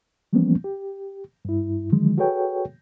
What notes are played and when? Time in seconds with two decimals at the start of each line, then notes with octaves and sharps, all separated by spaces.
0.33 E3 F3 G3 A#3 B3 C#4
0.64 G4
1.45 G2 E4
1.92 D3 D#3 F3 F#3 G#3
2.18 F#4 G#4 A4 B4 C#5 G5